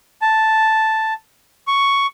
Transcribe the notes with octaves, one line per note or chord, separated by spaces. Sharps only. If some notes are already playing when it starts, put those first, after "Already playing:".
A5
C#6